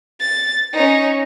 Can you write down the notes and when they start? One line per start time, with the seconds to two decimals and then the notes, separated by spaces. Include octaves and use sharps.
0.19 A6
0.73 C#4 D#4